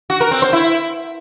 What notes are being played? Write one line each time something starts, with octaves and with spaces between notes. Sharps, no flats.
F#4
A#4
C4
C5
E4